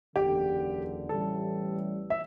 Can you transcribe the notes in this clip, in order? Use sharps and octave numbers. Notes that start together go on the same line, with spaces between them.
F#1 E2 D3 G4
A1 A2 E3 G3 A4
E5